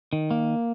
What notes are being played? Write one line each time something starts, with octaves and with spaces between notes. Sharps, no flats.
D#3
A#3